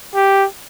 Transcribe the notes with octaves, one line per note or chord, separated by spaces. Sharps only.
G4